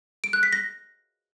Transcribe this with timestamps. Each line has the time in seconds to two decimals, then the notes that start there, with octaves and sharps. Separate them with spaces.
0.24 D7
0.33 F#6
0.43 B6
0.53 A#6